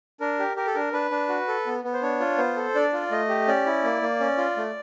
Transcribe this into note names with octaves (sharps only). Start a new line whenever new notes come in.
D4 A#4
G4
G4 A#4
A4
D4 A#4
D4 B4
D4
F#4
A4
B3
B3
C5
D4 C#5
F4
B3 C5
A4
D4 D5
F4
A3 D#5
G4
C#4 D5
E4
A#3
A#3
C#4
F4
A3